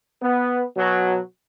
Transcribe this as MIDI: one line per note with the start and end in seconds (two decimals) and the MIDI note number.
0.21 0.62 59
0.76 1.18 47
0.76 1.18 54